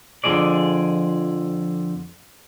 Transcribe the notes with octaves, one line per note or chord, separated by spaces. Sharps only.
F2 D3 F3 G#3 G#4 D5